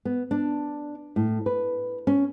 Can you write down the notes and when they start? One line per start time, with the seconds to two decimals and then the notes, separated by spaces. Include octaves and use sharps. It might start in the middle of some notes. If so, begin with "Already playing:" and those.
0.05 B3
0.31 D4
1.16 A2
1.46 B4
2.07 C#4